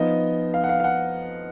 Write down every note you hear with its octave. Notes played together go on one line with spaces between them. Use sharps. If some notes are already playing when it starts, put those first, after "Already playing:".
Already playing: F3 B3 D#4 D#5
F5
F#5
F5
F5
F#5